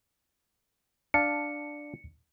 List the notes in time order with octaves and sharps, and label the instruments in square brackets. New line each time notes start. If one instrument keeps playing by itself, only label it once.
[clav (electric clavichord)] D4 F5 A5 [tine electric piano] C#7